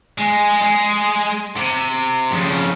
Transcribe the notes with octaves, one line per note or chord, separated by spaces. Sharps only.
G#3
G#3
C3
F2 C#3